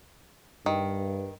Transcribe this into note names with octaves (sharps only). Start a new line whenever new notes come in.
G2 D#3